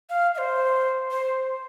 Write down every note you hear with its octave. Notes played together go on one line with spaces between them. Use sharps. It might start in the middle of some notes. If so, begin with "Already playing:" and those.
F5
E5
C5
C5